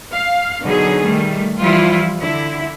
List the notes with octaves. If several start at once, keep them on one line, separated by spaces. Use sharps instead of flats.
F5
B2 D3 F#3 D#4 G#4
D#3 G3 A3
E3 F3 G3 E4 F4
D3 E4